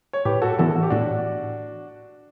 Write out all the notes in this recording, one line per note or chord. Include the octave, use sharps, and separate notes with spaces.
C#5
A2 G4 B4
F#4 A4
E3 B3 F#4 A4
F#4
G4
A2 D4 F#4